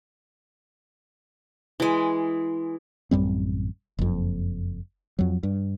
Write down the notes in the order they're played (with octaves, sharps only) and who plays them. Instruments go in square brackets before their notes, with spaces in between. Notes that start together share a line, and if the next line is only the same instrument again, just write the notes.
[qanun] E3 G#3
[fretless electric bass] A1 F#2 G3 C4
F#1 F2
F2 F#3
G2